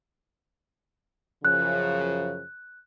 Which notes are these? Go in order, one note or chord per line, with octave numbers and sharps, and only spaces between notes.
F#2 C#3 F3 F#6